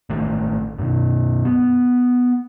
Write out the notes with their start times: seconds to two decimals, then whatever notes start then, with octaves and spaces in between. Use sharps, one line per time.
0.10 A1 D#3 A3
0.79 F#2 B2
1.45 B3